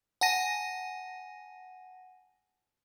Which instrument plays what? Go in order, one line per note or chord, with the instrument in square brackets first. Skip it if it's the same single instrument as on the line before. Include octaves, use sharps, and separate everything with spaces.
[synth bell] F#5 G#5 A5 A#6 D#7